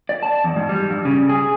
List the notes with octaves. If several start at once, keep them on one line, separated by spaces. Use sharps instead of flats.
D5
A5
E2
G#2
G3
G2
C#3
G#4